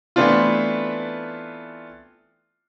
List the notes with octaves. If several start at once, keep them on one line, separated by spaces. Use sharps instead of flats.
E3 A3 B3 C4 D4 F4